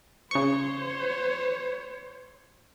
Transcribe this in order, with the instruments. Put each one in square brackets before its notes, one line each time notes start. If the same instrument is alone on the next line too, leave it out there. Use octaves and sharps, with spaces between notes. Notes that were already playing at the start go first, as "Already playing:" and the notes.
[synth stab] C#3 C#6 [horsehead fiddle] C5 C#5